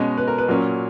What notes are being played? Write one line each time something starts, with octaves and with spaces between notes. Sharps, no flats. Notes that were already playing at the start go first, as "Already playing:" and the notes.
Already playing: B2 G#3 C#4 D#5
B4
A#4
B4
A#2 F#3 C#4 A#4